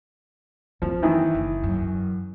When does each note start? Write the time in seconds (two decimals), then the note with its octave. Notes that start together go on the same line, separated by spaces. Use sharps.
0.82 F#2 F3 C4
1.02 D#3 E3 E4
1.34 F#1
1.63 F#2